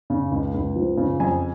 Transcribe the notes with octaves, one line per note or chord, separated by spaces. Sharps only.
C#3
C#2
C#2
F3
C#3
F2 G#5